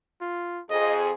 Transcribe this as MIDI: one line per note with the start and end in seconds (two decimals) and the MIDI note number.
0.21 0.61 65
0.70 1.12 41
0.70 1.12 68
0.70 0.97 75